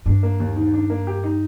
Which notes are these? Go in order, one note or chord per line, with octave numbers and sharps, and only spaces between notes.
G2 D4
A#3
D#2
D#3
D4
A#3
G4
D#4